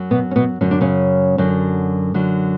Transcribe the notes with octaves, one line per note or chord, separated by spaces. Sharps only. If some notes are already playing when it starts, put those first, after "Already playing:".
Already playing: F#2 F#3
B2 B3
C#4
B2 B3
F#2 D3 F#3 C#4
D4
C#3 C#4
F#2 D3 F#3
F#2 D3 F#3